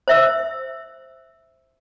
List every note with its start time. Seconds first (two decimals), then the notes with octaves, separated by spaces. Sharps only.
0.08 C5 E5 E6